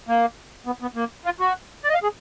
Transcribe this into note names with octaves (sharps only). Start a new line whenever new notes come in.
A#3
B3
B3
A#3
F4
F#4
D5
D#5
F5
G#4